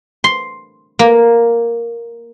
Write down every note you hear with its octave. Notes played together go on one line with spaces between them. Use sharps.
C6
A#3